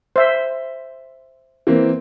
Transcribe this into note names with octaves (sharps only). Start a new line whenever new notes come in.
C5 E5
E3 A#3 C4